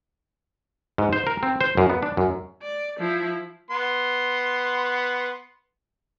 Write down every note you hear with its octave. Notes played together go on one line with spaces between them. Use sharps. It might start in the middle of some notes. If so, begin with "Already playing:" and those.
G#2
C5
A#4
C4
C5
F#2
B3
D4
F#2
D5
F3 E4
B3 C6